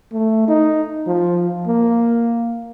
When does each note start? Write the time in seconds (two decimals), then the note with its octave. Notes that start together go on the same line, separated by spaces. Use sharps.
0.12 A3
0.48 D#4
1.07 F3
1.67 A#3